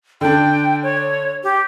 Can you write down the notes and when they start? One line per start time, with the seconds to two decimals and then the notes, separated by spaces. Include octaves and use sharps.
0.21 D3 D4 G5
0.83 C#5
1.43 G4